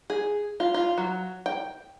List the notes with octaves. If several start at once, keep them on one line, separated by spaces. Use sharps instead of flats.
G#4
F4
F4
F#3
G5